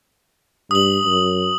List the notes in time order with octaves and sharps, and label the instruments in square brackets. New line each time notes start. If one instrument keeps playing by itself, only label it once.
[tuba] G2 [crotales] D#6 F#7
[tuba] F#2